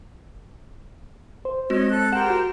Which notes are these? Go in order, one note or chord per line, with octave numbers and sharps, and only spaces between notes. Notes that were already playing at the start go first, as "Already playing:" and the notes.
C5
G#3 C4 F#4 C#5 D#5
A4 F#6
G4 G#4 A#4 C5 F#5 E7
F#4 E7